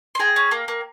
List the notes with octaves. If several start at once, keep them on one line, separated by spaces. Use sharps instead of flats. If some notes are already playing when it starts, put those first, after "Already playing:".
C6
G#4 G5 A#5
C#4
A#3
A#3